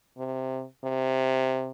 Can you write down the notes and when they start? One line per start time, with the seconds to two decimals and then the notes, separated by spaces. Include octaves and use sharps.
0.18 C3
0.84 C3